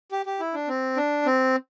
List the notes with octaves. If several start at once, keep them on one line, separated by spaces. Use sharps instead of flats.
G4
G4
E4
D4
C4
D4
C4